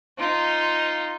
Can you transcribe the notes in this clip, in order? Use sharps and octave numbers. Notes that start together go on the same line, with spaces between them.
D#4 F4